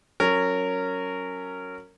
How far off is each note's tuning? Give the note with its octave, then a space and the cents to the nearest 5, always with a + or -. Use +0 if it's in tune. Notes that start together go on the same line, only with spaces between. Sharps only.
F#3 +0 C#4 +0 A#4 -20